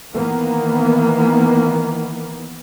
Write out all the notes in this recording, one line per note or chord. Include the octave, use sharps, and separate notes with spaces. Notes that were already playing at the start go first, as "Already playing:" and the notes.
D#3 E3 A#3 B3